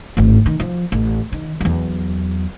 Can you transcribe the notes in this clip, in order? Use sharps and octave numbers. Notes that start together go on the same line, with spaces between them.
G#1 A2
D#3
F3
A1
D#3
E2 F#3